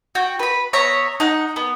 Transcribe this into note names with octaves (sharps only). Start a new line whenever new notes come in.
F#4 G5
B4 B5
B3 C#5 E5 A#5
D#4 F#5 F#6
B3